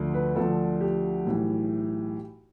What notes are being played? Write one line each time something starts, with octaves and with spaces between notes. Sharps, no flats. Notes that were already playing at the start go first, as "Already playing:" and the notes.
Already playing: D2 D3 F3
B4
D2 D3 F3 A4
G4
B1 A2 E3